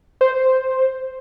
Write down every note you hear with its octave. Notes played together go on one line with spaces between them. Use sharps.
C5